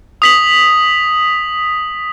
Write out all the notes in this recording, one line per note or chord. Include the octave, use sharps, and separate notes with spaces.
D#6 B6 F#7